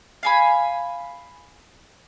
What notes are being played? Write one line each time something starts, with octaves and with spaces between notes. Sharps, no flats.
F5 G#5 B5